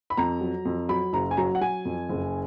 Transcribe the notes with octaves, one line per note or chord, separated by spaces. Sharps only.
B5
F2 A#5
F#3
F2
F#3 B5
F#1 A#5
G#5
F#3 A#5
F#5
F#3 G#5
F2
F#1